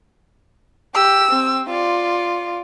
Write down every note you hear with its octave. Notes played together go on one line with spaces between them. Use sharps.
G4 E6
C4
F4 D5